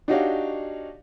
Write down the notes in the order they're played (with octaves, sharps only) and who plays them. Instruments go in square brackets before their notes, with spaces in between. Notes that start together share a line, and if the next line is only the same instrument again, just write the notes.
[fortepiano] D4 D#4 F#4 G4 C#5 F5